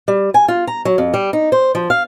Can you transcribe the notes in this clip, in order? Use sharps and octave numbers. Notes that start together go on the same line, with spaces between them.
G3
G#5
F4
A#5
F#3
F2
G3
D#4
C5
F3
F5